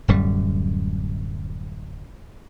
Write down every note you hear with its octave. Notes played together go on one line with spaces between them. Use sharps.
D1 F#2 G3